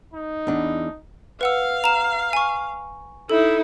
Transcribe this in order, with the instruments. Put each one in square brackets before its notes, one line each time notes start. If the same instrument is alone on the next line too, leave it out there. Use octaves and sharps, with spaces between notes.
[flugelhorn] D#4
[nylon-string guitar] E2 D4
[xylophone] B4 F#5 E6 [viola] F5
[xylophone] A#5 E7
G#5 C#6
[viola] D#4 E4 [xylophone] A4